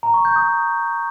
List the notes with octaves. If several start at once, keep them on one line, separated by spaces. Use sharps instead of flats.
A#5
C#6
G6
D#6